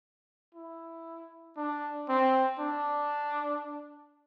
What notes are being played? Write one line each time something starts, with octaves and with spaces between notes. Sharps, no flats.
E4
D4
C4
D4